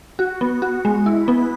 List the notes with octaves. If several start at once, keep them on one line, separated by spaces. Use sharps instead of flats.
F#4
B3
F#4
G#3
E4
B3